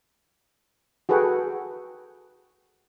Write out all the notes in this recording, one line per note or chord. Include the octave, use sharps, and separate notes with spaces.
F#4 G#4 A4 B4 F#5 G5